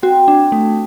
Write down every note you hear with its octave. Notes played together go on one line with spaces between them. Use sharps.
C4 F#4
D4
A3